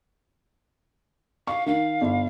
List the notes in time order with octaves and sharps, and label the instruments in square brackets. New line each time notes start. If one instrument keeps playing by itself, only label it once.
[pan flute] F5 [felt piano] C#6
[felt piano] D#3 [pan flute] F5
[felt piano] G1